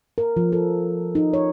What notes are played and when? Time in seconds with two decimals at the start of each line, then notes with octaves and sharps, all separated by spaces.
0.18 A#4
0.37 F3
0.52 A4
1.15 D#4
1.33 C#5